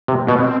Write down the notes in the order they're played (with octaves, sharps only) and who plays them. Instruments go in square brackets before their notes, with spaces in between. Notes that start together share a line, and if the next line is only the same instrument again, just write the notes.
[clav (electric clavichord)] C3
[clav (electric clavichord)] B2 [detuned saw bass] B3
[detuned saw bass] C4